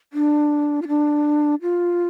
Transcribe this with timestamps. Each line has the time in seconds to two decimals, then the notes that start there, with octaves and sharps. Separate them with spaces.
0.13 D4
0.82 F4
0.88 D4
1.62 F4